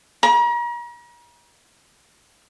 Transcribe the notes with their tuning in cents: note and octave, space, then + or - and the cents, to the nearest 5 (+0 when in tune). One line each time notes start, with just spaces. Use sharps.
A#5 +40